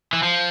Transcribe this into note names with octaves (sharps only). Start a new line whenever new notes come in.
E3
F3